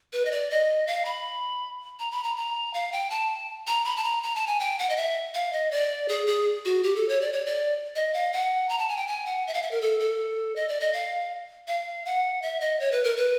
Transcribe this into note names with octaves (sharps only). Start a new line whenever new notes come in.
B4
D#5
D5
D#5
F5
B5
A#5
B5
A#5
A#5
F5
G5
A5
A#5
B5
A5
A#5
A#5
A5
G#5
G5
F#5
D#5
E5
F5
D#5
D5
G#4
G#4
F#4
G4
A4
C#5
D5
C#5
D5
D#5
F5
F#5
A#5
A5
G#5
G5
G#5
F#5
E5
F5
E5
A#4
A4
A4
D#5
D5
D#5
F5
F5
F#5
E5
D#5
C#5
B4
A#4
B4